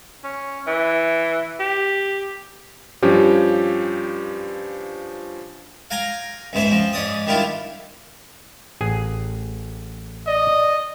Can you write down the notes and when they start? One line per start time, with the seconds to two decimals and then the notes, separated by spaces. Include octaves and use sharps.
0.24 C#4
0.67 E3
1.60 G4
3.02 G2 F3 C#4 G4
5.90 F5 G5 G#5 A#5
6.53 C#2 G#2 B2 C5 E5
6.72 F3 C4
6.93 G#2 C#4 D5 D#6
7.26 D#3 G3 D4 E4 F4
8.81 A1 G#4 G#5
10.27 D5 D#5